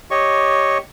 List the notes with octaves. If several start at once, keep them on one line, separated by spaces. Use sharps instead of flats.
G4 C#5 D#5 C#6